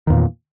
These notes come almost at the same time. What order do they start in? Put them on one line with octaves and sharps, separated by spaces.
D#3 E2 A#2